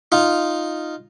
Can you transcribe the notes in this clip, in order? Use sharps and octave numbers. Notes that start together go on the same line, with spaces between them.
D#4 F4